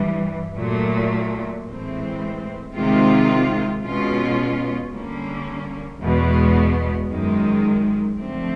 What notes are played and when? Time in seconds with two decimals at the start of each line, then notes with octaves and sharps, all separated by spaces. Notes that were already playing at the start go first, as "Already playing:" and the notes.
Already playing: G2 E3 G3
0.56 A#2 F#3 A3
1.65 A2 E3 G#3 C4
2.74 C3 D#3 G#3 C4 F4
3.83 B2 G#3 C#4 F4
4.92 D3 G3 A#3 C#4
6.01 E2 B2 G#3 B3
7.09 F#2 D#3 G#3
8.18 D3 F3 A3 C4